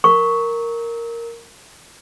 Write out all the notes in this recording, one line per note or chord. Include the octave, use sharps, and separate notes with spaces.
A#4 C#6